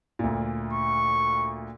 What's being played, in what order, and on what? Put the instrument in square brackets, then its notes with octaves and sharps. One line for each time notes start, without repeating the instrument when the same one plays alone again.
[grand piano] D2 A#2
[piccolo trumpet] C#6